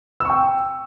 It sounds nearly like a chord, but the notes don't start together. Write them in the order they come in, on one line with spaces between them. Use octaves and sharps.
E6 C#6 G5